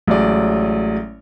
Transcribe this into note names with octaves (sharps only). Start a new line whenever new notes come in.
A1 F#3 G#3 D5